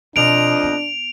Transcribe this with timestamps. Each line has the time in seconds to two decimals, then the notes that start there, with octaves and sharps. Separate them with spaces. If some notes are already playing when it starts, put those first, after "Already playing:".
0.16 F2 B2 F3 D4 D#5 D7 F7
0.63 B3